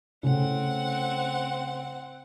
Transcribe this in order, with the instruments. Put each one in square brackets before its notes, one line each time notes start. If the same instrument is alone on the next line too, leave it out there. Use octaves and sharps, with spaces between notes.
[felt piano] A2 C#3 A3 [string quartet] C4 F#5